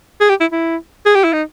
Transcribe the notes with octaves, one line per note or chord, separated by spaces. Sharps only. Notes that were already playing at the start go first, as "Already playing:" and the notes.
G#4
G4
E4
E4
G#4
G4
E4
D#4